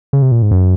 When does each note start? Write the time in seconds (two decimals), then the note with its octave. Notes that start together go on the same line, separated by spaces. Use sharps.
0.13 C#3
0.22 C3
0.32 A#2
0.42 G#2
0.51 F#2